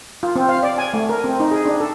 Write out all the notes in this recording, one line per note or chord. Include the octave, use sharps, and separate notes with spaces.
F4
C4
F5
D5
G#5
A3
A#4
C4
D#4
G#4
D4
A4